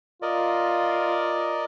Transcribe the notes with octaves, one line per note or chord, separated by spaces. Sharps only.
F4 A#4 D5 D#5